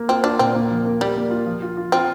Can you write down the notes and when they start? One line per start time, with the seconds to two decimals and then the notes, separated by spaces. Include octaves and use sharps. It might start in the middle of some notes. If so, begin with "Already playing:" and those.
Already playing: A#3
0.08 C4 F4
0.24 D4 F4
0.39 A#2 C4
0.55 A#3
0.70 F3
0.85 A#3
1.01 G3 A#3
1.16 A#3
1.31 F4
1.46 F3
1.62 F4
1.77 F4
1.92 C4 F4